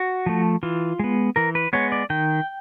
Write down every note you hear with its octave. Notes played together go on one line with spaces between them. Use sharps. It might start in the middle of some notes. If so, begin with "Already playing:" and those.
Already playing: F#4
F3 A3
E3 F4
G#3 B3
E3 A#4
B4
G#3 B3 C#5
D5
D#3 G5